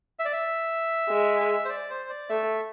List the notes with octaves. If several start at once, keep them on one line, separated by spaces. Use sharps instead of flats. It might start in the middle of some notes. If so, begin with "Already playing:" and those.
E5
D5
E5
G#3
C5
D5
C5
D5
A3 E5